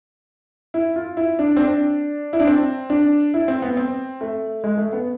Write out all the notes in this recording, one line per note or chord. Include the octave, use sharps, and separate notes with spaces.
E4
F4
E4
D4
C4
D4
E4
D4
C4
D4
E4
C4
B3
C4
A3
G#3
A3
B3